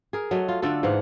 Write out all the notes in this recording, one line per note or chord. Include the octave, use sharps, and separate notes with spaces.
G#4 A#4
F#3 A3 D#5
F4
D3 D4 F4 A4
G#2 E3 F5 F#5